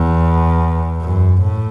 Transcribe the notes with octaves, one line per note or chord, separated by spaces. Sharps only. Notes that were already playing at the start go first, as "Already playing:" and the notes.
Already playing: E2
F#2
A2